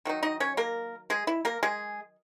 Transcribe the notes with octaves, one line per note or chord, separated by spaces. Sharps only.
D#3 F#3 D#4
D#4 D#5
C#4 C#5
A#3 A#4
G#3 G#4
E4
A#3 A#4
G#3 G#4